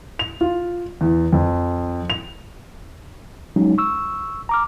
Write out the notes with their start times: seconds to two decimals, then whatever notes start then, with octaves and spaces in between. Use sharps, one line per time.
0.19 F7
0.41 F4
1.01 E2
1.32 F2
2.10 F7
3.56 F#3 G#3 C#4 D#4
3.78 C#6 E6
4.49 A#5 D6 F6